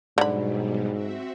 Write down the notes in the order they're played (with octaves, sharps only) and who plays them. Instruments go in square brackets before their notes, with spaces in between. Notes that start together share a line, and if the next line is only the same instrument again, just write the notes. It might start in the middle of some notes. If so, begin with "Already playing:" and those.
[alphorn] G#2 [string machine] B2 F#3 G3 [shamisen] D3 B5
[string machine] C4 F#4 E5